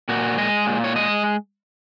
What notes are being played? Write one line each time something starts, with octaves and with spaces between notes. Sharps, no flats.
A#2 F#4
G#3 D#5
A#2
C#5
G#3 D#5